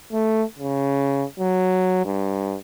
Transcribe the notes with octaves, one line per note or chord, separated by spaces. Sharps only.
A3
C#3
F#3
G2